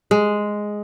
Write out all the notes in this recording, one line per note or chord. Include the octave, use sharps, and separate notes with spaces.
G#3